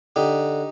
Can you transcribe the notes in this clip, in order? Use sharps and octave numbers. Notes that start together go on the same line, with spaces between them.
D3 D#4 G4